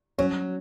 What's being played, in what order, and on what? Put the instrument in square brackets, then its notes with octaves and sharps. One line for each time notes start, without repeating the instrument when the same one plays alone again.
[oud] F#3 [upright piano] C#4